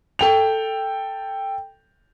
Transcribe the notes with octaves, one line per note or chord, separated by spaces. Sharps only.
A4 G5 F7